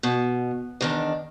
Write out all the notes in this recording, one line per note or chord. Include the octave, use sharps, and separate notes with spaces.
B2
E2 D#3 D4